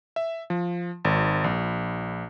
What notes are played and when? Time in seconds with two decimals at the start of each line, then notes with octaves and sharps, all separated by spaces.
0.16 E5
0.50 F3
1.05 G#1
1.44 A#1